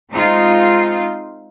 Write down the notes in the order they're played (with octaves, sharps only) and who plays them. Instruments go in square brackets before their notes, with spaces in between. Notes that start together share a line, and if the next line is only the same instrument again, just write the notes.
[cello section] G#3 C4 D#4 F4